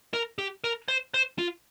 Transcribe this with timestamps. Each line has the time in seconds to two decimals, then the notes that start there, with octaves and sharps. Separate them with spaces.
0.14 A#4
0.38 G4
0.64 A#4
0.88 C5
1.14 C5
1.38 F4